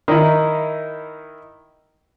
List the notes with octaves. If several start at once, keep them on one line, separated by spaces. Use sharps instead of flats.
D#3 D#4 E4